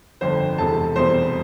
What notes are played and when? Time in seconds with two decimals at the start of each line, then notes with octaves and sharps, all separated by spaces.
0.21 G1 F2 D3 C5
0.58 E1 E2 C3 A4 A5
0.96 F1 E2 B2 G3 C4 C5 C6